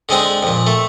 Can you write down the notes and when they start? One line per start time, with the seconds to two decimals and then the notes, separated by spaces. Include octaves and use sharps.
0.09 D3 G#3 C4 G#4
0.43 F2 A#2
0.67 A3